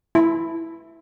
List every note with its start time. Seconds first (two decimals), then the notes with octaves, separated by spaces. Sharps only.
0.15 E4